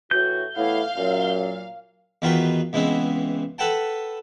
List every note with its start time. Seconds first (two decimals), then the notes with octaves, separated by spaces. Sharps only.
0.11 A2 E3 F#4 G6
0.56 A2 E3 B3 E4 F5
0.97 F#2 A#2 F#3
2.22 E2 D#3 F4 F#4 B4 G5
2.73 C#2 E3 G#3 B3 C4
3.58 A4 B4 F#5 G5 A5